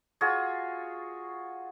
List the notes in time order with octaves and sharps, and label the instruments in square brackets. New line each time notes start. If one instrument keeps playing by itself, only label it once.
[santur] F4 F#4 G#4 C#5